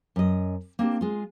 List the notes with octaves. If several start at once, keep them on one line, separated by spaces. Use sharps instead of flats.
F#2 D#5
A#3 C4 D4 G4
G#3 F4